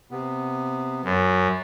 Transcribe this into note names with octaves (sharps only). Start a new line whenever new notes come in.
C3 B3
F#2